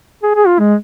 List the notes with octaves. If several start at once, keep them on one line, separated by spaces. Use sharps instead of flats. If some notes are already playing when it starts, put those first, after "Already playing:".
G#4
G#4
F4
G#3